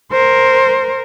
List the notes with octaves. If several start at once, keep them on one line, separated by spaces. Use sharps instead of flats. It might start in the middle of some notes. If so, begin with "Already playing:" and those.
A#4 C5